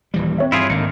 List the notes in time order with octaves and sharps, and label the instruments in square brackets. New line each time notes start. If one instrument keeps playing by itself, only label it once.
[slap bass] D#1 E3 G3
[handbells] C4 C#5 E5
[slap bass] G2 [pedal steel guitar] E4 F4 G#4
[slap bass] G#1 [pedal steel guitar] D3 A#3 D#4 [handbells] C#7